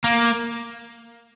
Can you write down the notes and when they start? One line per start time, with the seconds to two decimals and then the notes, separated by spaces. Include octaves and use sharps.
0.04 A#3